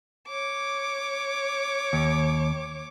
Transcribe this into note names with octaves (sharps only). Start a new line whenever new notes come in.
C#5 D6
D#2